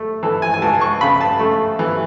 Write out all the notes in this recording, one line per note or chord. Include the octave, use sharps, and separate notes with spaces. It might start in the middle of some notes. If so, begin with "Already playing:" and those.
Already playing: A3
E3 A4
G#5
G#5
C#2 A5
C#6
C#3 B5
A5
A3
E3